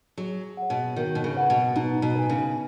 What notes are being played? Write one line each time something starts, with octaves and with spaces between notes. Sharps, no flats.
F#3 G#4
C#5 F#5
B2
D#3 F#4
B2
C#3
B4 F#5
B2
B2 D#4
B2
B4 G#5
C#3